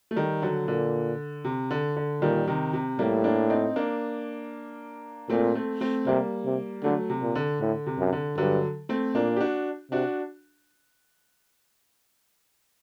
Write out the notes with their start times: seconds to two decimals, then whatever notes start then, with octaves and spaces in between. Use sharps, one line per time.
0.11 A3
0.16 D#3 G3
0.42 D3 F#3
0.67 A#2 D3
1.45 C3
1.71 D3
1.96 D3
2.22 A#2 D#3 G3
2.47 C3 D#3
2.73 C3
2.99 A2 G3 A#3
3.24 A#3 D4
3.50 C4 D#4
3.76 A#3 D4
5.30 A#2 A3 C4
5.55 A3 C4
5.81 A3 C4
6.06 C3 G3 A#3
6.45 C3
6.84 D3 F#3 A3
7.10 C3
7.22 A#2
7.35 D3
7.61 A2 D3
7.86 C3
7.99 F#2
8.13 D3
8.38 G2 D3 F#3
8.89 A3 C4
9.15 A#2 A#3 D4
9.36 G4
9.41 D4 F#4
9.91 C3 D4 F#4